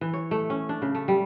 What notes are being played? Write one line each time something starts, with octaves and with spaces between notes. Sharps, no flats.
E3
C#5
A3
C#4
D4
C#3
A3
G3